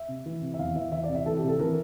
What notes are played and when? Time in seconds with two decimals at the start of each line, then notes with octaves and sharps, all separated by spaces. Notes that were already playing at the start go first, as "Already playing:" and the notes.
Already playing: E5
0.08 C3
0.26 E3
0.42 C3
0.54 E5
0.59 E2 F5
0.75 E3 E5
0.92 E3 E5
1.04 D5
1.09 C3
1.15 E5
1.26 E3 A4
1.37 G4
1.43 C3
1.48 A4
1.59 E3 A#4